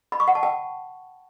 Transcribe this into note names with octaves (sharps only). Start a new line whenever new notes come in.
B5
C#6
F#5
A5
G5